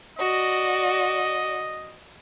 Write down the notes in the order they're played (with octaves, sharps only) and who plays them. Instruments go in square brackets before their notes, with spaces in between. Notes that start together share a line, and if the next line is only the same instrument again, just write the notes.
[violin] F#4 D5 [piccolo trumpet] D#5